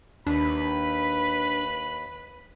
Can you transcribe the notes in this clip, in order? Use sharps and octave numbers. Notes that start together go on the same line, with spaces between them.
D#2 D4 B4 B5